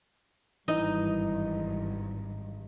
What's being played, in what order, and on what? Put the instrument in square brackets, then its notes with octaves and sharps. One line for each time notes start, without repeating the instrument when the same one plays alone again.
[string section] G#1 G2 [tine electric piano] E3 [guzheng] D#4 D#5